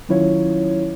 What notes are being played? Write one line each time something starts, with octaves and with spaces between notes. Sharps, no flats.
D#3 F#3 C#4 E4 F4 C#5